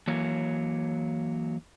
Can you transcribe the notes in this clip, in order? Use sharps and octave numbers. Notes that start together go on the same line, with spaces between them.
E3 F#3 A#3 C#5